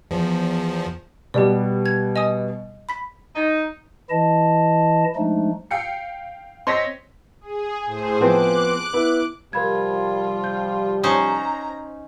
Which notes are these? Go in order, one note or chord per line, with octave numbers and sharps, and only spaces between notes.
E2 F3
B2 G3 B3 G4 D5
G#6
D#5 G#5 D#6
B5 B6
D#4
E3 E4 D#5 A5
F3 G#3 A3 D4 D#4
F5 G5 C#7
C4 C#5 D#5 C6 A#6 B6
G#4
A2 G#4 C5
F3 B3 C4 D6 F#6
B3 E4
C3 F3 G3 F4 A#4 B5 G#6
G6
C#4 D#4 C5 A#5 D#6